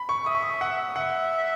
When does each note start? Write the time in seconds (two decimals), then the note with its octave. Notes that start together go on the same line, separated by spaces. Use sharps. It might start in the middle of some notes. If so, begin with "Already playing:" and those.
Already playing: B5
0.09 C#6
0.26 E5 D#6
0.35 C#6
0.42 D#6
0.61 F#5
0.96 E5 F#5